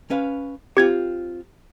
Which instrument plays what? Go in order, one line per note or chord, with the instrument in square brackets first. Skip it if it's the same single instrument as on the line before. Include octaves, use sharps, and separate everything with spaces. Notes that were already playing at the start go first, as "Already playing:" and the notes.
[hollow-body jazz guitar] C#4 B4 F5
[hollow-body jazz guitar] C4 F4 [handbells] G4 G#6